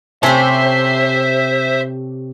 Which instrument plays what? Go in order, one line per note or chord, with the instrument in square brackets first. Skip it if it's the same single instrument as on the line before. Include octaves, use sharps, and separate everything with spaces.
[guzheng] C3 G4 [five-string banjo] A3 C4 C#4 [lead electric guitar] C5 [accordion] E5